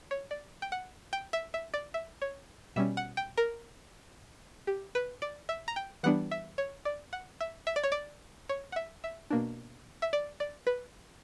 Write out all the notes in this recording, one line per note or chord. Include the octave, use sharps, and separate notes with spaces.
C#5
D5
G5
F#5
G5
E5
E5
D5
E5
C#5
B2 G3 C#4 E5
F#5
G5
A#4
G4
B4
D5
E5
A#5
G5
E3 G3 B3 D4 F#5
E5
C#5
D5
F#5
E5
E5
D5
C#5
D5
C#5
F#5
E5
E5
B2 A#3 D4
E5
D5
D5
B4